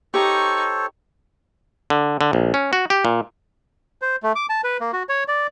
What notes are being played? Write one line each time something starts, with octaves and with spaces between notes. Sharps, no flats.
D#4 G4 A4 C5 C#5 C#6
D3
D3
A#1
C#4
F#4
G4
A#2
C5
A3
D6
A5
B4
A#3
F#4
C#5
D5